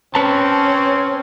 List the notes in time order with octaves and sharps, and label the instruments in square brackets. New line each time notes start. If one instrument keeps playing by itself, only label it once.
[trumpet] C4 [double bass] C#4 [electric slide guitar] B4 A5